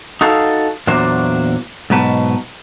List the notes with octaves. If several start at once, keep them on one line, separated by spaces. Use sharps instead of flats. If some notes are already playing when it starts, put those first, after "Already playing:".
D#4 F#4 A4 F5
E2 A#2 F#3 A#3 D4 C5
G#2 B2 F#3 B4 A5